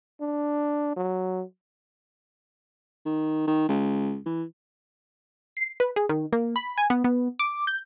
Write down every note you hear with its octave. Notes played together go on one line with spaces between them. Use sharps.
D4
F#3
D#3
D#3
C#2
E3
C7
B4
G#4
D#3
A#3
B5
G#5
B3
B3
D6
G6